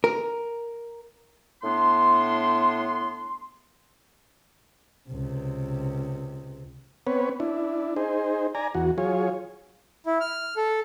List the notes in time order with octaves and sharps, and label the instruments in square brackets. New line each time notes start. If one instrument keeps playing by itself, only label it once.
[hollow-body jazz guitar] A#4
[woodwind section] A2 B3 D4 C6
[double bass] C#2 C3
[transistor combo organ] B3 C4 B4 C#5
D4 E4
D#4 G#4 C5
D5 G#5 A#5
E2 F#4
F#3 F4 G#4 C#5
[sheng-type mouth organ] E4
F6
A4